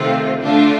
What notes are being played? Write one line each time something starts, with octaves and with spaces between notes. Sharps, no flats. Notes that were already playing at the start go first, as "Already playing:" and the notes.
Already playing: C3 D#3 A3 C4 F4
D3 A3 D4 F4